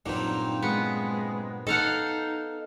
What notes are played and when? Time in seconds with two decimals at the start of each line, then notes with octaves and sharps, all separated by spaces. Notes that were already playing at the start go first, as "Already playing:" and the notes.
0.06 G2 A#2 F#3 A#3 C4 D#4
0.63 G#3 B3
1.67 D#4 A4 D#5 F5 F#5